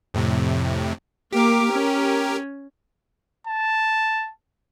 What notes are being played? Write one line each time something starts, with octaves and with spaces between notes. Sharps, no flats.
F2 A2 C3
A#3 G4 A#4 D6
C#4
A5